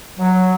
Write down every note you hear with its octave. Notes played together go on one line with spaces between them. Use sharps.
F#3